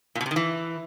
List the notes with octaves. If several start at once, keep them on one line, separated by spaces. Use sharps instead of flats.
A#2
B2
C3
D#3
E3